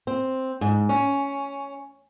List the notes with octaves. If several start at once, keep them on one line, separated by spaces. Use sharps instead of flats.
C4
G#2
C#4